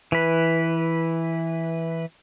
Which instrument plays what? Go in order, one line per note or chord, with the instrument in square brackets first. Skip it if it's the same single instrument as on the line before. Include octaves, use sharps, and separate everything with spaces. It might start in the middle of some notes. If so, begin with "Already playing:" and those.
[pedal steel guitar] E3 B4